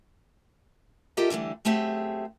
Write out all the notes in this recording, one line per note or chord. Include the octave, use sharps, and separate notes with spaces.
F4 G4 A4 A#4 D#5 E5
D3 E3 G3 A3
F#2 A3 C4 G4 G#4 E5